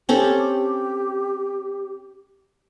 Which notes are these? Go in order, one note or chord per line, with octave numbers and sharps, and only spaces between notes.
C4 C#4 G4 A4